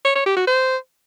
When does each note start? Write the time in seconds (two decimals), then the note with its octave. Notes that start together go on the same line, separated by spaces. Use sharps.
0.05 C#5
0.16 C#5
0.26 G4
0.37 F#4
0.47 C5